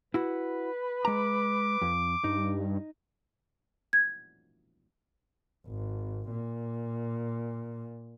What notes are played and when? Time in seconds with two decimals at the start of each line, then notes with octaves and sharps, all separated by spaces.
0.14 E4 F#4 B4
1.05 G#3 A#5 D6
1.81 F2
2.24 G2 D#4
3.93 G#6
5.67 G#1
6.31 A#2